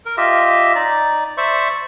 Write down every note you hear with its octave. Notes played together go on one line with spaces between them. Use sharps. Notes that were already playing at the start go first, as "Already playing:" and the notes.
A#4
F4 G4 D#5 E5
D#4 D5
C5 D5 E5 C#6